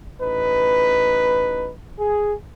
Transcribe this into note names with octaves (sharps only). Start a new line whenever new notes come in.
A1 D#4 B4
G#4